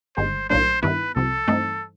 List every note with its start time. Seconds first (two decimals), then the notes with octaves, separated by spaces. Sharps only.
0.17 G1 G2 D#3 G#3 C5
0.50 B1 A2 F#3 A#3 D4 C5
0.82 G2 D#3 G3 B3 E4 B4
1.15 C2 C3 F3 A4
1.48 G2 E3 A3 C4 D#4